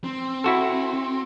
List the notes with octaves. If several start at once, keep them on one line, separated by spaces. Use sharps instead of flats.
C4
E4 F#4 A4